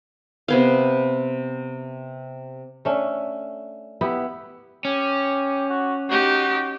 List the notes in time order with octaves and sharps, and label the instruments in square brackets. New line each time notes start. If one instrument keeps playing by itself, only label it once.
[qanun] C3 B3 F5
[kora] A3 C#4 D4
B3 E4 G4
[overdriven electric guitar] C#4 [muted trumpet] G4
[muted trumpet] F#4
[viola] D#4 G4 [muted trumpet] F#4